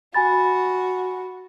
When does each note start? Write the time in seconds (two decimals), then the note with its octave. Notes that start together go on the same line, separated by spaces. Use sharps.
0.14 F#4 G#5 B5 A6